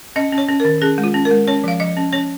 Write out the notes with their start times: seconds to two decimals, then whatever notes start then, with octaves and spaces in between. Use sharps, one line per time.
0.16 C#4 D#5
0.32 C#4
0.38 C#5
0.49 C#4
0.60 D#3 A#4
0.82 C#4 G#4
0.98 G#3
1.04 F4
1.14 C#4
1.25 A#4
1.31 G#3
1.48 C#4 C#5
1.64 F3 F5
1.80 F3 D#5
1.97 C#4
2.13 C#4 C#5